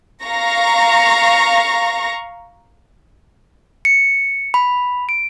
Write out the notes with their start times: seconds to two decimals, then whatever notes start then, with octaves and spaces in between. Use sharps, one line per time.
0.25 F5 A#5 C#6 A#6
3.85 C#7
4.54 B5
5.09 D7